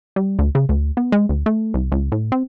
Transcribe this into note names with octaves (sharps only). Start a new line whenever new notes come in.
G3
D2
C#3
D2
B3
G#3
D2
A3
C2
C#2
A2
C4